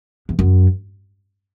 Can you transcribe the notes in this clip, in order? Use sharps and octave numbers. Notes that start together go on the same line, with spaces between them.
E2
F#2